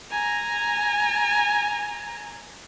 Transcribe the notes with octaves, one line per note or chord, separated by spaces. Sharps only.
G#5 A#5